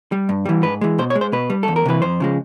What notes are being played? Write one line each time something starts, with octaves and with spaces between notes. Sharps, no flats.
G3
G2
E3 G3
G#2 B4
E3 G#3
B2 C5
C#5
G#3
C5
B2 B4
G3
E2 A4
A#4
C3 E3 B4
F2 C5
C#3 F3 G#3